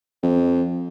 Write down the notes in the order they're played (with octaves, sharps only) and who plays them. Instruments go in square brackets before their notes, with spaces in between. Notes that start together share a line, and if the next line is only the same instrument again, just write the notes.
[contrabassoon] F2